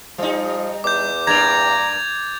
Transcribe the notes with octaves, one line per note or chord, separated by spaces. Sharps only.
F3 G3 D#4
E2 D6 G6
G2 A#3 A#5 G#6 A6 F7